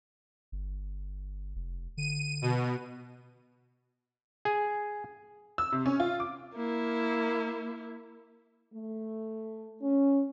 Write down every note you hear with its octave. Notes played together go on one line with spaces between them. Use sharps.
G1
F1
D3 D#7
B2
G#4
E6
C3
C#4
F4
D6
A#3 E4
A3
C#4